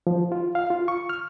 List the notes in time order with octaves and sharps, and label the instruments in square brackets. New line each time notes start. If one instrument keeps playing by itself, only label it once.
[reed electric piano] F3
F4
F5
F4
C#6
F6